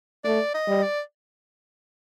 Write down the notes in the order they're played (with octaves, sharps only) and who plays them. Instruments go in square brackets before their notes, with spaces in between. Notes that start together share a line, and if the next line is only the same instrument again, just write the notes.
[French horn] A3 [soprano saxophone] D5
[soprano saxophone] D#5
[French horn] G3
[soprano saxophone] D5